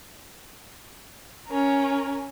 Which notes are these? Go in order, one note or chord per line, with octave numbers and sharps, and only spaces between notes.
C#4 A#4